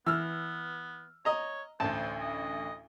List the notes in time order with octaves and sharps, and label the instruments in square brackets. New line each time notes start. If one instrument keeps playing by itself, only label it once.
[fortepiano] E3 [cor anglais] B3 [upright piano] E6 F6
[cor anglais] C#5 [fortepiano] D#5 A#5
[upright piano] A1 D2 [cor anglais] C5 [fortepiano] A5
[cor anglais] D#5